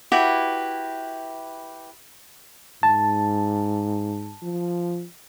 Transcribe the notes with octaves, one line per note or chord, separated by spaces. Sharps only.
E4 F#4 G4 B4
G#2 A5
F3